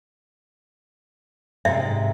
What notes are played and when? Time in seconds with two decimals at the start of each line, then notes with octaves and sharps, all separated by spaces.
1.65 G#2 C3 E5